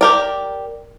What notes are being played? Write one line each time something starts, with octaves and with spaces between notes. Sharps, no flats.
G4 A#4 D5